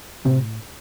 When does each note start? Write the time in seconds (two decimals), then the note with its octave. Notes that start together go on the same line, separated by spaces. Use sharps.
0.25 A2 C3 C4